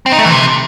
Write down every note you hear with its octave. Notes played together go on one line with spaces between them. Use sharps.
C4
D#4
A3
E3
C3